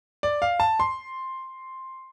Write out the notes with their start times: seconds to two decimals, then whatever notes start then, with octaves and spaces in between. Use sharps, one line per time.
0.23 D5
0.42 F5
0.60 A5
0.80 C6